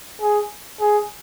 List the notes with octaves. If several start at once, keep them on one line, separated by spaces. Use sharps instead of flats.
G#4
G#4